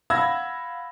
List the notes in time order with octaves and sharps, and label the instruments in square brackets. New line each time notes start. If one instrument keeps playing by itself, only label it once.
[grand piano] F5 F#5 B5 E6 G#6 A#6